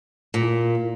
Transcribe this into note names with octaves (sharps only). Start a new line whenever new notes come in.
A#2